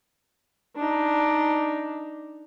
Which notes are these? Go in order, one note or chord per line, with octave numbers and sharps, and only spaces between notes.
D4 D#4